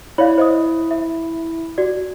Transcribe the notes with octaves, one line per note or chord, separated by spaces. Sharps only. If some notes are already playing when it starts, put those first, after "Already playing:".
E4 C#5 D5 F5
C5 D#5 D#6
E5
F#4 D5